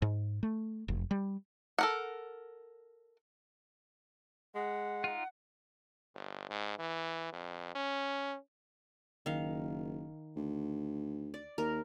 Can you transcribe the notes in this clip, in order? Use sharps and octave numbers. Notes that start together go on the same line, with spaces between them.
G#2
A3
F1
G3
A4 A#4 F#5
G#3 F#5
D#4 F4
G1
G#2
E3
F2
C#4
F#1 D#3 F5
D2
D5
D#2 A#4